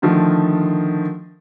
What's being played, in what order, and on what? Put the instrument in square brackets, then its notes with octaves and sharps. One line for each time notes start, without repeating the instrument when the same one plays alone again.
[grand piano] D3 D#3 F3 A3 F4